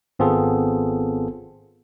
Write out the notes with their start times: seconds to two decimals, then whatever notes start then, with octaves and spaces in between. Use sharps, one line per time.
0.19 G#1 B3 C4 F4 G#4 A4